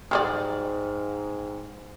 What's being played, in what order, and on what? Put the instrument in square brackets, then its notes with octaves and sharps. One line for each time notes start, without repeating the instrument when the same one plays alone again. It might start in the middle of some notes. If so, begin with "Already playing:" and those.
[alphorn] G#2 [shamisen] F#3 G3 D5 [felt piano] G5 F6